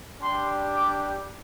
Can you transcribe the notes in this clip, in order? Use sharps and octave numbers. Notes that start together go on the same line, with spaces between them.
G3 D4 G4 C6
D6